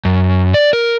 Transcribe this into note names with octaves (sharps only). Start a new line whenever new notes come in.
F#2
D5
A#4